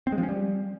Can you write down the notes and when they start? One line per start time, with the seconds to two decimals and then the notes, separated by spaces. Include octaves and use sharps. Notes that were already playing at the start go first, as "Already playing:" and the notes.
0.07 C4
0.12 G#3
0.18 F3
0.23 C#4
0.29 G3